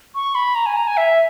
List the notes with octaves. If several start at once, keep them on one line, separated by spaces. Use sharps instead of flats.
C#6
B5
A#5
G#5
A#5
G#5
E5